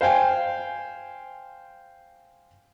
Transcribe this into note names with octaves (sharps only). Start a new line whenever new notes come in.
C5 F5 G5 G#5